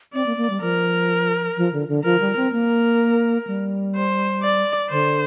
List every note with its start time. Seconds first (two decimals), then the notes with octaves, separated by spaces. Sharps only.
0.14 C4 D5
0.26 A#3
0.37 A#3
0.50 G3
0.62 F3 A#4
1.57 F3
1.73 D3
1.88 D3
2.04 F3 A#4
2.20 G3
2.36 C4
2.52 A#3 A#4
3.47 G3
3.95 C5
4.42 D5
4.90 D3 C5